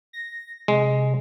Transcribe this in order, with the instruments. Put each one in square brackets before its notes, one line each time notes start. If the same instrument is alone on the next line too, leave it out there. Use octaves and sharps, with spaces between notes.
[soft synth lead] A#6
[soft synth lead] C3 [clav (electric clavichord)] G#3